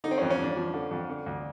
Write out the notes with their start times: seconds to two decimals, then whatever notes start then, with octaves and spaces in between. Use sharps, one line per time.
0.04 D3 D#4
0.11 C4
0.18 C#4
0.22 F2
0.30 C#4
0.39 F2 D4
0.57 F3
0.74 D3
0.91 F2
1.09 D3
1.26 D2